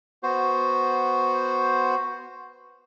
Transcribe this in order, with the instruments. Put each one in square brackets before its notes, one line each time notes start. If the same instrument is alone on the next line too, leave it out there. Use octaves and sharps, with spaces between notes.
[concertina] B3 F#4 C5